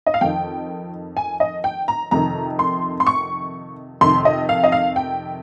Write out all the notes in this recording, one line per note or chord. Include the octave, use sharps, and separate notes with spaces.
D#5
F5
F2 D#3 G5
G#5
D#5
G5
A#5
F2 C3 D#3 A#5
C6
C6
C#6
F2 C3 D#3 C6
D#5
F5
D#5
F5
G5